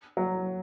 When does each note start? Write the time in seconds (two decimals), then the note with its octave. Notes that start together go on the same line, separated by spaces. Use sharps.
0.17 F#3